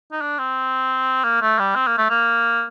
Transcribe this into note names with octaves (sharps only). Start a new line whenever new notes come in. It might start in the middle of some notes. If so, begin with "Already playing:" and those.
D#4
D4
C4
A#3
A3
G3
C4
A#3
A3
A#3